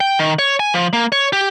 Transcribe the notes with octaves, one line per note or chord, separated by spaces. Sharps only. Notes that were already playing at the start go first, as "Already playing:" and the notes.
G5
D#3
C#5
G#5
F3
A#3
C#5
G4